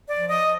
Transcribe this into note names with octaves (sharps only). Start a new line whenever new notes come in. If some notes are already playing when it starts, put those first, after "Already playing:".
D5
F3
D#5
F3